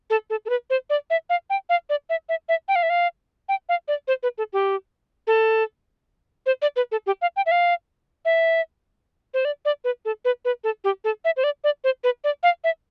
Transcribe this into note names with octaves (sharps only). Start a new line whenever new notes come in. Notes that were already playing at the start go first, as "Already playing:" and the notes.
A4
A4
A4
B4
C5
D5
E5
F5
G5
F5
D5
E5
E5
E5
G5
F5
E5
F5
G5
F5
D5
C5
B4
A4
G4
A4
C5
D5
B4
A4
G4
F5
G5
E5
F5
E5
C5
D5
D5
B4
A4
B4
B4
A4
G4
A4
E5
C5
D5
D5
C5
B4
D5
F5
E5